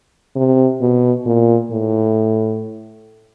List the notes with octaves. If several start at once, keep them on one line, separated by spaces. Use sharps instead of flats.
C3
B2
A#2
A2